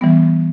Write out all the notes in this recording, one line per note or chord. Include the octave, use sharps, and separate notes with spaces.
E3 G3 B3